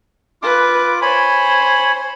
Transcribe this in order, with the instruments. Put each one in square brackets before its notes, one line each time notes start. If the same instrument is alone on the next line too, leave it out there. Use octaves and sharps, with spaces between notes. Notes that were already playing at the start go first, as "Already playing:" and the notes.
[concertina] F4 D6 [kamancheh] B4
[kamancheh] C5 [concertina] C#5 G#5 B5